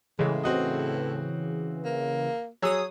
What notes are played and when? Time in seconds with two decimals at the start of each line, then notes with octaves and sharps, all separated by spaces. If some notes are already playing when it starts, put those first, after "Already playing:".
0.19 A2 C#3 E3 G#3
0.44 C4 F#4 D#5
1.85 A#3
2.62 F#3 G#4 C#5 D#6 E6